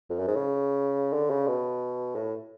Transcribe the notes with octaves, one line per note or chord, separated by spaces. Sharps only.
F2
F#2
G#2
C#3
D3
C#3
B2
A2